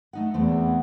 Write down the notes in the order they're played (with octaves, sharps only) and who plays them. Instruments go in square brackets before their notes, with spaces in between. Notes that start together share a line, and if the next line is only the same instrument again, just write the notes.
[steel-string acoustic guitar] A3 D#4 F#5
[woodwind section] E2 [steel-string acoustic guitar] E3 A3 C4